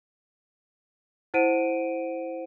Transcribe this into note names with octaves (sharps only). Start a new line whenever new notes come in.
E4 C5 F#5 D7 D#7